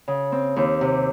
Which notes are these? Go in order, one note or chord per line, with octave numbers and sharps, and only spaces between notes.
C#3
C4
D#2
C3